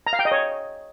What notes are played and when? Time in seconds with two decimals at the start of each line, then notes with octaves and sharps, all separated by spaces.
0.07 A#5
0.13 F5
0.19 G5
0.25 D#5
0.32 C#5